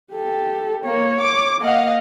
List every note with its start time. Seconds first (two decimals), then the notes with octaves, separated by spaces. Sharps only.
0.12 G4 A4
0.85 A#3 C#5
1.21 D6
1.62 A#3 D#5 F5 F#5